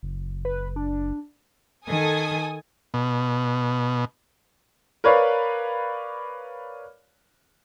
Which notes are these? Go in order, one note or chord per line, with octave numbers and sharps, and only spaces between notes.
F#1
B4
D4
D#3 A4 G#5 D#6
B2
A#4 B4 C#5 D5 F5